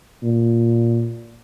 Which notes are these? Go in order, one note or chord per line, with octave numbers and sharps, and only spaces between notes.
A#2